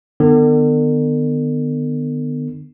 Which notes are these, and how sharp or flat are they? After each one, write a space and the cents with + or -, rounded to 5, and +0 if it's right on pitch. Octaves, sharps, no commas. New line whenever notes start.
D3 +45 B3 +5